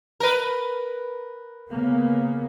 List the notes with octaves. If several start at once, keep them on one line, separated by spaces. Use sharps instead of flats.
A#4 B4
C#3 A#3 B3